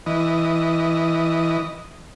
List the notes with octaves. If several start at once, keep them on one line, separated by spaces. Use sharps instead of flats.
E3 D#5